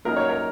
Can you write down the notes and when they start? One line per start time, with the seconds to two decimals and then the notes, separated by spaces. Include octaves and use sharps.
0.05 F#2 F#3 A#3 D#4 A#4
0.16 C#5
0.29 A#4